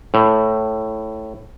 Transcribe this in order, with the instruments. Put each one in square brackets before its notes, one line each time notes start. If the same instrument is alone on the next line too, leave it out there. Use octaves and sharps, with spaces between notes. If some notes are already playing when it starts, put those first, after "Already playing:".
[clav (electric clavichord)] A2